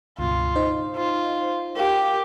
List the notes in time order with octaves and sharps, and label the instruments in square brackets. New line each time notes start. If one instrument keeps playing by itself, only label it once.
[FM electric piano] C#2 G2 B2 [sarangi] F4
[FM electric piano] D#4 C5 D#5
[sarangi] F4
[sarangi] G4 [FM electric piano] A#4 F5